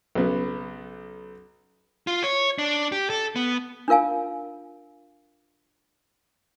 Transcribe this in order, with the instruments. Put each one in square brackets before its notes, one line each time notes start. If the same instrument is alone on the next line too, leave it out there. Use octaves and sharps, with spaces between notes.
[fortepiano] B1 C#3 B3
[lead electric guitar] F4
C#5
D4
G4
A4
B3
[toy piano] D4 F4 A#4 F5 G#5